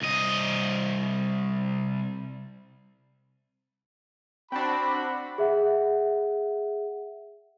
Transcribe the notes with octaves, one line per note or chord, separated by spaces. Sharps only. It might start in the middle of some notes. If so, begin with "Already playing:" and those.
C2 D#5
C4 D4 F#4 B5
G#4 E5 F#5